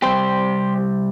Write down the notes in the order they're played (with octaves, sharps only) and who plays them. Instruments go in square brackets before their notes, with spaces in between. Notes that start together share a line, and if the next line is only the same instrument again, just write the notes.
[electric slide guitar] C3 G3 C4 G4 C5